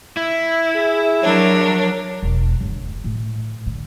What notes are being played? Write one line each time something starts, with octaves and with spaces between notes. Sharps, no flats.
E4
G#4
F#3 D4 A#4 C#5
E1
G1
A2
D3